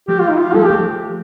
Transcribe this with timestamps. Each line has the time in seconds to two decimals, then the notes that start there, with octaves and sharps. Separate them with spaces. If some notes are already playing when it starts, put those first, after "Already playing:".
0.08 F3 A3 G4
0.19 F4
0.29 D#4
0.39 F4
0.54 G3 A#3 A4
0.65 F3 A3 G4